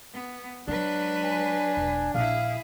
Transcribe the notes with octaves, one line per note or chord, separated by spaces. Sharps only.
B3
F#3 G#3 D4 B4
G#5
E1
A#1 E4 G#4 F5